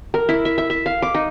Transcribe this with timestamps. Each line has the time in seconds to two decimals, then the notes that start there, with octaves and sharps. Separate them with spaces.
0.14 A#4
0.29 E4
0.45 E5
0.58 E5
0.70 E5
0.86 F5
1.02 D6
1.15 D#4